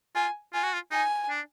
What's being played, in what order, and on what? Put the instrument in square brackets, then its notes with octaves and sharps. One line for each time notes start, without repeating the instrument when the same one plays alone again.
[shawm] F4 [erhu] G#5
[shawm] F4 [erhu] G#5
[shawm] F#4
F4
[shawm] D#4 [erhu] G#5
[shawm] D4